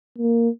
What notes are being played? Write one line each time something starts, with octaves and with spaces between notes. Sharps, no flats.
A#3